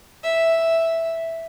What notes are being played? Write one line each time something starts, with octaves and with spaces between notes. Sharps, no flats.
E5